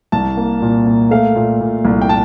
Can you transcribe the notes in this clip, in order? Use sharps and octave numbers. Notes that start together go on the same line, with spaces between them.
C2 A5
A#3
A#2
A#3
A3 F5
A#2
A#2
C2
G5
A5